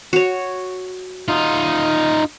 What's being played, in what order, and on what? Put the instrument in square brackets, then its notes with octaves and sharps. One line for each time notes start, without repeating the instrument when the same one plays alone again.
[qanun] F#4 C#5
[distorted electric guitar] D#4 F4